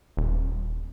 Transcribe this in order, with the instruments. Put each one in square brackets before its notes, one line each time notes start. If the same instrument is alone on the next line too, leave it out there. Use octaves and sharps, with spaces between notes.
[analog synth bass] D#1